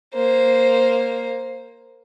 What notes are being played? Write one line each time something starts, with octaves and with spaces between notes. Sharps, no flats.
A#3 C5